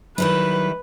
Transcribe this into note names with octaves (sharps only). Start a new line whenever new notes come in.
D#3 F#3 G3 E4 B4